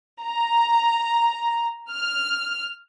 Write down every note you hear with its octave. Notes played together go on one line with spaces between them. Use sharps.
A#5
F6